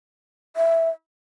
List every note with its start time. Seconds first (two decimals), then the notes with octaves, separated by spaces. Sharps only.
0.56 E5